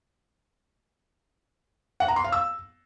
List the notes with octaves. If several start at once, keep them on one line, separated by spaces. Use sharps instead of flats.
F#5
A#5
C6
F5
E6